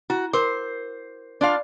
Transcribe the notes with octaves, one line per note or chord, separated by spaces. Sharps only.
E4 F#4
A#4 C5 D6
D4 F4 D5 F5